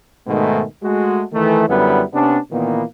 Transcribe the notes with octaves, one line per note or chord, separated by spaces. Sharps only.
G#2 B2 D#3 G#3 A3
G#3 A3 F#4
D#3 E3 A3
F#2 D3 G3 B3 E4 B4
C3 B3 C#4 D4
A#2 D#3 E3 A#3 B3